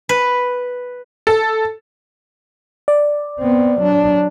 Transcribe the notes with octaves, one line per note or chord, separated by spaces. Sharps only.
B4
A4
D5
B3 C4
F#3 D4